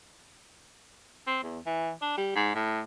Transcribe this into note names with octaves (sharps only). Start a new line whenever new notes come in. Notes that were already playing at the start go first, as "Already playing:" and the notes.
C4
E2
E3
D4
G3
G#2
A2